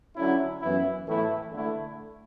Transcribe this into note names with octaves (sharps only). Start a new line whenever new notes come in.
D3 F#3 C#4 E4
F#2 E3 B3 E4
A2 E3 A3 E4
D3 A3 E4